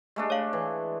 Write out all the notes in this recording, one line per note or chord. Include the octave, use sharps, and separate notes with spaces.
G#3 A3 D4
C#5 F5
E3